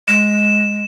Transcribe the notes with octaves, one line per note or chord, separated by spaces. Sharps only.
G#3 E7